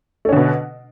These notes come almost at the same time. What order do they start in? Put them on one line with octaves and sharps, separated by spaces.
A3 C#4 D3 B2